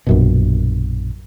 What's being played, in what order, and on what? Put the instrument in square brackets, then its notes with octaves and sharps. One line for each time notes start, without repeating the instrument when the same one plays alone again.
[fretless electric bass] A#1 F#2 B2